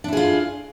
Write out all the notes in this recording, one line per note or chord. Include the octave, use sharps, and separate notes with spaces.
D4 E4 F4 G#4